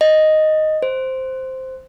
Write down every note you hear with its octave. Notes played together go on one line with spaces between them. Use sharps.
D#5
C5